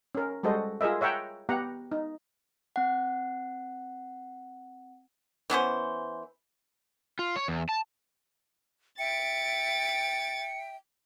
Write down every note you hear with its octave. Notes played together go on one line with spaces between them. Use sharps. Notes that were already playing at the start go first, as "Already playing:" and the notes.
C#4 A#4
G3 G#3 F#4 A4 C5 D#5
F4 G#4 A#4 D#5 E5
C#5 E5 F#5 G5 A#5
B3 G4 F#5 A#5
D#4
C4 F#5
E3 B3 C#4 C5
F4
C#5
E2
A5
E5 G5 A6 C#7 D7